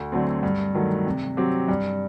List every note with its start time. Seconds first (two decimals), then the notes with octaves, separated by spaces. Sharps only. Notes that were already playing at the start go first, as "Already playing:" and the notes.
Already playing: D2
0.12 D3 F#3 A3 C4
0.43 G2
0.75 D#3 F#3 A3
1.06 C3
1.37 F#3 C4 G4
1.68 G2